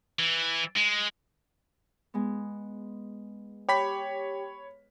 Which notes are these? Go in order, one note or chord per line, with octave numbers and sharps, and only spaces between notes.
E3
G#3
G#3 B3
G4 C#5 B5 B6